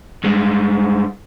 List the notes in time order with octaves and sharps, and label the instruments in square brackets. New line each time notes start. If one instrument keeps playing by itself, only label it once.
[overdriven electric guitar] G2 G#3